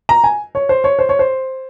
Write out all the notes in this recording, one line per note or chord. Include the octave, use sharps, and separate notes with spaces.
A#5
G#5
C#5
C5
C#5
C5
C#5
C5